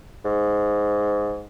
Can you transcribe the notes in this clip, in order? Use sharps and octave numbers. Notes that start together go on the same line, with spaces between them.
G#2